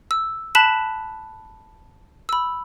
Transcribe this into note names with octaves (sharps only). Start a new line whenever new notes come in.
E6
A5 B5 F#6 B6 E7 F#7
B5 E6